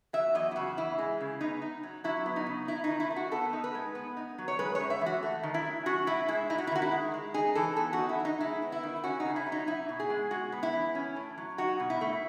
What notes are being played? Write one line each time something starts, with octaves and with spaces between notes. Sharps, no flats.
F#3 E5
E2 D#5
E4
C#3 F#4
E3 E4
G#3
C#3
B3 D#4
D#4
F#3
F#3 E4
B3
D#4
C#3
D#4 E4
D#4
D#3
E4
A3
F#4
B3 A4
D#4
B4
G#3
B3
D#4
F#3
C#5
G#3 B4
C#5
F#2
E5
E3
F#4
A3
D#3
E4
F#3
C#4 F#4
A2 E4
G#3 E4
D#4 E4
F#4
E4
D#3 F#4
E4
G#3
G#3
D#4 G#4
E3 A4
B3 A4
F#4
D#4
E4
F#3 D#4
G#3 E4
B3
E4
D#3
C#4 F#4
D#4
C#3
E4
F#3
D#4
D#4 E4
B2
G#4
G#3
G#3 F#4
B3
E4
E3
C#4
A2
F#3
D#4 F#4
B2
E4
A3